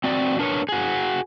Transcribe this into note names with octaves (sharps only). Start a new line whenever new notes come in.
C4 F#4 D5
D4 A#4 B4 C#5
F#4 G#4